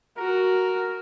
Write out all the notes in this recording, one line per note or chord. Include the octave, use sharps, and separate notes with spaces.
F#4 A#4